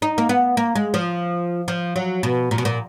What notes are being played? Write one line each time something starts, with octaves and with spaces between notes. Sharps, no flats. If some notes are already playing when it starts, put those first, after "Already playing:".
D#4
A#3
B3
A#3
G#3
F3
F3
F#3
B2
A#2
B2
A#2